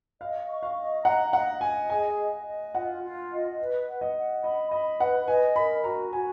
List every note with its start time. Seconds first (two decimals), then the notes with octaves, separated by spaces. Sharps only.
0.21 D#5 F5
0.49 C#6
0.63 F5
0.76 D#5
1.05 F#5 A#5
1.33 D#5 F#5
1.61 D#5 G#5
1.90 G#4 G#5
2.18 D#5
2.46 D#5
2.74 F4 F#5
3.03 F4
3.31 D#5
3.58 B4
3.87 F#5
4.01 D#5
4.16 F#5
4.44 D#5 B5
4.71 D#5 B5
5.00 B4 F#5
5.28 D#5 G#5
5.56 A#4 B5
5.84 F#4 A#5
6.12 F#4 G#5